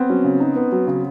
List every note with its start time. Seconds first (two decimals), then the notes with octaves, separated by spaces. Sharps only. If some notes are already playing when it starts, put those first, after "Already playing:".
Already playing: B3 C4
0.09 F#3 C#4
0.24 C#3
0.40 D#4
0.56 B3
0.72 F#3
0.87 C#3